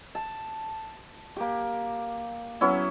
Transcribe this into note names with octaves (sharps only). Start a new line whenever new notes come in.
A5
A#3 G4
F#3 B3 C#4 E4